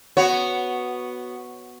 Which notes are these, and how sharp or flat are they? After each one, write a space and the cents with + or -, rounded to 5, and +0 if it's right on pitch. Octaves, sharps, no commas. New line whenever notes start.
B3 +0 F#4 +0 C#5 -5